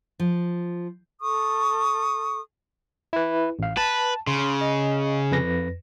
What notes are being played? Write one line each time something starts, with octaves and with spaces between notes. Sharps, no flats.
F3
A4 C#6 D#6
E4 B4
A1 F5
B4 A5
C#3 C6
D#5
F2 B4 A#6